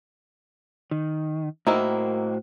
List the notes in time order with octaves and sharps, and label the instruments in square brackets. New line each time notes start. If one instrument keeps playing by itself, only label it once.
[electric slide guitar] D#3
[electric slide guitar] A2 F#4 C5 [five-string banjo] D#3 A#3 E4